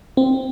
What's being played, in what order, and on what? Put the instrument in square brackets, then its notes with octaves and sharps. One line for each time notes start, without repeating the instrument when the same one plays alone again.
[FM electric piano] C4